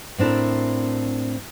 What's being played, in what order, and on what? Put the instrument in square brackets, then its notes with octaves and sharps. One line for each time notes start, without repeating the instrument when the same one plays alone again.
[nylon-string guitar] A2 C4 D4 E4 A#4